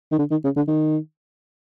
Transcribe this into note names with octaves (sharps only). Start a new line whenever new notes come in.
D#3
D3
D#3
C#3
D3
D#3